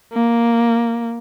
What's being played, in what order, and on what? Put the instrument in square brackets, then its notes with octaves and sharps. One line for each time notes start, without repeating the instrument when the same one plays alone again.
[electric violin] A#3